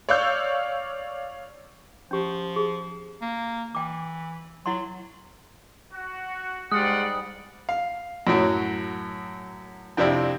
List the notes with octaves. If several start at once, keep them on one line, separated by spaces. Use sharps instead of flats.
C#5 D5 F5 C#6 E6 G6
F3 C#4 G4
G#4
A#3
E3 G5 D6
F#3 E4 F#5 C6
F#4
G#2 G3 G#3 F4 G4 D5 F#5 D#6
F5
F#2 A2 F#3
F2 C3 C4 D4 E4